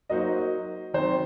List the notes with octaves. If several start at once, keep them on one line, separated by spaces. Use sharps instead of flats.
F#3 A#3 D#4 F#4 C5 D#5
D#3 F#3 C4 C5